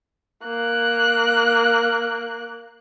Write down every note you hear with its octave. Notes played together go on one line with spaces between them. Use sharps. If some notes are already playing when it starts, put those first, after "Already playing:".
A#3 F#6